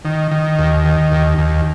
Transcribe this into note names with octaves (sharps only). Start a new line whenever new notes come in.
D#3
D#3
D#2
D#3
D#2
D#2